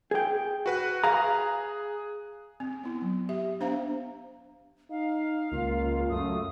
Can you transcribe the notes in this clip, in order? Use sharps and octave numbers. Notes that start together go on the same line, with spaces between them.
G#4 G5
F#4 B4 F#6
G#4 F5 A#5
C4
B3 E4
F#3
G4 E5
B3 D4 C5 F5 A#5
D#4 F5
C#2 A#3 F4
F#2 A3 D#6